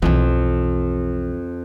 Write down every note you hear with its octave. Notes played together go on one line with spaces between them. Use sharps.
B1 F2 E3